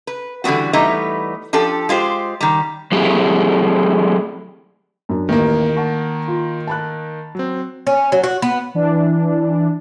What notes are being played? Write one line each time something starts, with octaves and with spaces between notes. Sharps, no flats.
B4
D3 E3 G3 B3 F#4
E3 G3 A3 B3 D#4
F3 D4 G4 A4
G#3 F4 G4 C5
D#3 G3
F#3 A3 C4 E4 G4 G#4
F#2 D4
A1 D#2 D#3 A#3
F#5 A5 C#6
F4
A5 B5 F#6
F#3 C4
C#4
F#3
F#4
B3
E3 D4